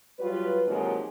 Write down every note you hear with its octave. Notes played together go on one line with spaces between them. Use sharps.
F#3 G3 F4 B4
C3 D#3 F3 F#3 G#3 A#3